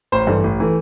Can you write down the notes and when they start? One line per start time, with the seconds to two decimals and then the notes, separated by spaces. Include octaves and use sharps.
0.12 A1 C5
0.27 G2 E3 A3
0.44 A1
0.60 E3 A3